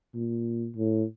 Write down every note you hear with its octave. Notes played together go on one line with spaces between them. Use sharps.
A#2
A2